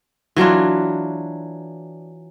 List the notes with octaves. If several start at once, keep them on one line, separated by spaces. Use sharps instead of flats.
E3 F#3 D4 F4